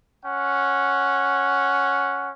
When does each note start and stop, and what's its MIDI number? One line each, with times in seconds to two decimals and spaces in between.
0.23 2.31 61
0.23 2.31 78